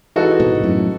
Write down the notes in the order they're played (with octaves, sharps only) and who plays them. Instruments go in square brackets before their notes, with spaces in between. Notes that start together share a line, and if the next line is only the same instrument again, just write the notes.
[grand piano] E3 G#3 D#4 F#4 A4
[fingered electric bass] G#2 B2
B2
F#2 A2